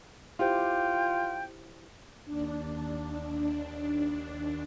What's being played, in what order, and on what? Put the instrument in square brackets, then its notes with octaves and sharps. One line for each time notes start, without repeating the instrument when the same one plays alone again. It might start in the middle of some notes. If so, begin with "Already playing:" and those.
[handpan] E4 G4 C5 [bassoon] F4 [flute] G5
[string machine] D#2 D4